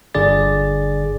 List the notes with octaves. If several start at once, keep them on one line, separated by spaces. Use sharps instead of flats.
G1 G2 D3 G#4 D5 A6